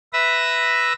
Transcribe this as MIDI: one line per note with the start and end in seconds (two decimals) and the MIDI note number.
0.13 0.93 71
0.13 0.93 76
0.13 0.93 88
0.13 0.93 94